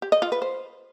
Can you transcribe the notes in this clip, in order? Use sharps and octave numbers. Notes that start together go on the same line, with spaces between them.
G4
D#5
F4
B4
C5